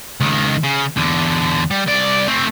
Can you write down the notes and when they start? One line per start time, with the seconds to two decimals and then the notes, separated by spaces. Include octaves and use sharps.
0.20 C#2 D#3
0.64 C#3
0.97 E2 D3
1.71 G3
1.87 C2 D5
2.28 A3 C4